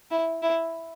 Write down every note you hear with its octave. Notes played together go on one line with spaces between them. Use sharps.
E4
E4